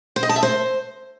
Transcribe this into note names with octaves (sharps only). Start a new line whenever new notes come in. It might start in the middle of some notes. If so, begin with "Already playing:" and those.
C5
D#5
A5
E5
C5